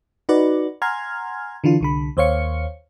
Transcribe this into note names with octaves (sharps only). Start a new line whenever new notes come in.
D#4 F#4 B4 D5
F#5 G#5 A#5 C6 F6 G#6
D3 E3 D4 F4
C2 D3 B5
D#2 C5 C#5 F5 C#7